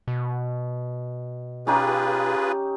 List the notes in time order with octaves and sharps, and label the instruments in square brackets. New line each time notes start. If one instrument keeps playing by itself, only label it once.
[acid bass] B2
[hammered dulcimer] C#4 D#4 G4 [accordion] F4 G#4 B4